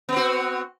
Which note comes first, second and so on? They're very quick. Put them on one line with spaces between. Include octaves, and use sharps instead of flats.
B3 C4 F#4